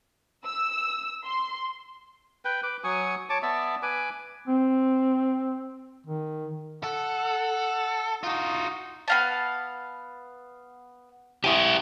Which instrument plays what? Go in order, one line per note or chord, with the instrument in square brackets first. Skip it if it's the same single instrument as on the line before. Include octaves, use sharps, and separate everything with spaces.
[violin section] E6
C6
[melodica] B4 G5
B4 D6
F#3 G#5 C#6 D#6
C#5 A5 D6
B3 D5 E5 A5
B4 G#5 D6
[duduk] C4
D#3
[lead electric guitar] A4 [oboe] F#5
[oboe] D#4 [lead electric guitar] F4 F#4
[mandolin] B3 F5 A5
[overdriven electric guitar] E4 G4 [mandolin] G#5 D#6